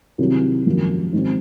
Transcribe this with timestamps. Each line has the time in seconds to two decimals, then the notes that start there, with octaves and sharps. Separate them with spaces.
0.18 C2 C3 D#3 F#3
0.66 G#1 F#2 F3 A#3
1.13 G#2 D#3 F#3 C4